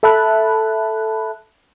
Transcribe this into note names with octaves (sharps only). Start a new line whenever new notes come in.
A4 E5 A5 B5 F#6